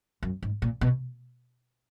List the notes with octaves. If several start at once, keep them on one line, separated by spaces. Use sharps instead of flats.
F#2
G#2
A#2
B2